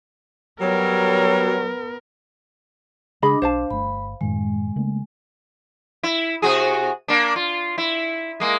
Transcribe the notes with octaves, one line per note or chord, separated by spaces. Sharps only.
F#3 G3 B3 A#4
C#3 G#3 D4 G#4 D#5 B5 D6
B1 C5 F5 A5
G1 A3 B5
F#2 A2 D#3 G#3
C#3 A3 A#3
E4
C3 F#4 G#4
A#3 D4
F4
E4
G#3 A#3